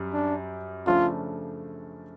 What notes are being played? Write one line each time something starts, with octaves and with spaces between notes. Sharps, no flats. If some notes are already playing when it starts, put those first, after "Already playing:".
Already playing: F#2 G3
D4
C#3 F3 A3 D4 F4